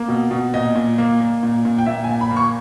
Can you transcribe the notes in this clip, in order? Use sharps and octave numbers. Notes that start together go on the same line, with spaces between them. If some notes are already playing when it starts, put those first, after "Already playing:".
Already playing: A#3
B2
B2
A#2 D#5
A#2
A#3
A#3
A#2
A#2
G5
A#2 E5
G#5
A#2
B5
A#3
C#6